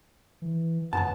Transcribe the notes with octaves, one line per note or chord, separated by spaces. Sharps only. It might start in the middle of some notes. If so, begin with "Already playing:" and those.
E3
C#2 F#2 B3 A5